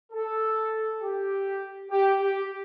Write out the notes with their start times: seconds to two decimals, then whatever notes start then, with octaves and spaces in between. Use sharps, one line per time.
0.12 A4
1.01 G4
1.90 G4
2.20 G4